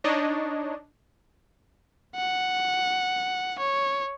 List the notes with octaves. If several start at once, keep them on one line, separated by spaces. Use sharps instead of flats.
D4 D#4 C#5 D#5
F#5
C#5